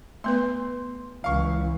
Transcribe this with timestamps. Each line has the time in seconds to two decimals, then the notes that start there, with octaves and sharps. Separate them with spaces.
0.24 A3 B3 B4 C6
1.24 C#2 E3 F5 C#6